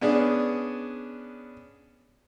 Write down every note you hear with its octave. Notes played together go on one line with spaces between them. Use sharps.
B3 C#4 D4 G#4